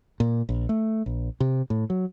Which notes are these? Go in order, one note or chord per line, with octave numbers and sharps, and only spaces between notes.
A#2
A#1
A3
A#1
C3
A2
F#3